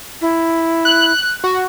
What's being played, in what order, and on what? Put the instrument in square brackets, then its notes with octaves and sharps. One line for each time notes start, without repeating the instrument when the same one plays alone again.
[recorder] E4
[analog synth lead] F#6
F#4